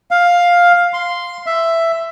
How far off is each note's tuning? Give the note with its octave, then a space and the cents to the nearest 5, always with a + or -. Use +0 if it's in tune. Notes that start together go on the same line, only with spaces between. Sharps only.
F5 +10
C6 -5
E5 +10